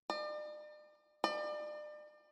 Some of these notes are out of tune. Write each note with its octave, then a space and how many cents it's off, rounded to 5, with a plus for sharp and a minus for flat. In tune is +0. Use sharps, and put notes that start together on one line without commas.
D5 +40
D5 +35